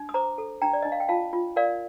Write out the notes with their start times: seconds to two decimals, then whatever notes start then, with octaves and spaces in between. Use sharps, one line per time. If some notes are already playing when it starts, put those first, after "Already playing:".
Already playing: D4
0.09 D#6
0.14 C5 A#5 D6
0.38 A4
0.62 D4 G5 A#5
0.73 D5
0.82 D4 D#5
0.92 F5
1.00 G5
1.09 F4 F5 A5
1.33 F4
1.56 A#4 D5 F5